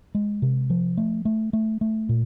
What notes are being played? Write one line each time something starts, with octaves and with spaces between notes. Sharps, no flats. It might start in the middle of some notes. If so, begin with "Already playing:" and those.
G#3
C3
F3
A3
A3
A3
A3
A#2